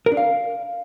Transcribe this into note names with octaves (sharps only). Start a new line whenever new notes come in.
A#4
D4
F5